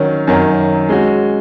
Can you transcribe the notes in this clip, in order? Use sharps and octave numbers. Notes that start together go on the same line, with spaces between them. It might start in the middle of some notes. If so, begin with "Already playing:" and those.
Already playing: D#3 F#3 C#4
F#2 D#3 F#3 C#4
G#3 C#4 F#4